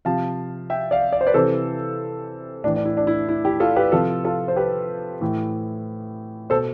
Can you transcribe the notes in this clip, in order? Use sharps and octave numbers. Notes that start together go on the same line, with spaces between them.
C3 F3 F5 A5
E5 G5
D5 F5
D5
C5
B4 D5
C3 E3 A4 C5
A2 E3 D4
D4
E4
D4
E4
E4
E4 G4
F4 A4
G4 B4
C3 F3 F4 A4
F4 A4
C5
G4 B4
A2 E3
B2 A4 C5